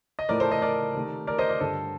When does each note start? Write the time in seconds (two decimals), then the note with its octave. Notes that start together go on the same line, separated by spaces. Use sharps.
0.19 D#5
0.29 A2 F3 A3 A#4 D5
0.40 A4 C5
0.51 C5 D#5
0.62 A#4 D5
0.95 C3 D#3 A3
1.27 A#4 D5
1.38 C5 D#5
1.49 A#4 D5
1.60 G2 D3 G3 A4 C5